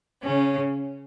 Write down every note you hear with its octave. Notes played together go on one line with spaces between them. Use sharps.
C#3 C#4